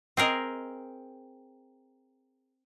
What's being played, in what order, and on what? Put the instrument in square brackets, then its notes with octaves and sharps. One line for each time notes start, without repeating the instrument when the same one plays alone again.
[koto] C4 G#4 A#4 D#5